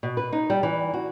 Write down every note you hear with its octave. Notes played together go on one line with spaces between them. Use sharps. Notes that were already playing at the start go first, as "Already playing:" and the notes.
B2
B4
D#4
G3
E3
F#4